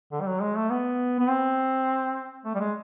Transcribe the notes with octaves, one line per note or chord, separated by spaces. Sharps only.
D3
G3
F#3
G#3
A3
B3
B3
C4
A3
G3
G#3